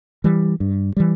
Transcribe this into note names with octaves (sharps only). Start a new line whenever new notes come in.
E3 G3
G2
E3 G3